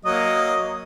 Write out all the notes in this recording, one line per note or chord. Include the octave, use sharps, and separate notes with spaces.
F#3 A#3 D#5